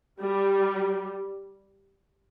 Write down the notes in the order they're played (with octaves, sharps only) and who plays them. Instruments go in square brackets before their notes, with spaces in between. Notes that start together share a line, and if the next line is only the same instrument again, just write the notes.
[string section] G3